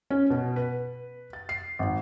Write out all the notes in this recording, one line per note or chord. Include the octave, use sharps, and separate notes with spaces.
C#4
B2
B4
A6
C7
G#1